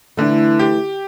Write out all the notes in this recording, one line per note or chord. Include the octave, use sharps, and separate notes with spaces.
D3 E3 A3
G4